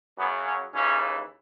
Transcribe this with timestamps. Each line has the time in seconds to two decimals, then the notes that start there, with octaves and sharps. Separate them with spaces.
0.18 F#2 C#3 F#3 B3
0.46 C#4
0.75 D#2 C#3 E3 C#4